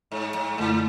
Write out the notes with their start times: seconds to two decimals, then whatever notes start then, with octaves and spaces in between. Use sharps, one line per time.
0.12 G#2
0.35 G#2
0.58 F#2 A2 D3 A3 E4